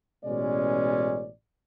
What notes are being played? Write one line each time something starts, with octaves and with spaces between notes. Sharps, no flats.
A1 B2 G#3 C#4 D5